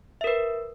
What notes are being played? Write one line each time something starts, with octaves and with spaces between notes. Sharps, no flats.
A#4 B4 E5